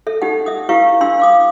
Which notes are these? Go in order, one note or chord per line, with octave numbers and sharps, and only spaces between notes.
A4 E5
D#4 G4 F#5
E5 D#6
E4 G4 B4 F5 C#6
D4 F5 C6 E6
F5 D6 D#6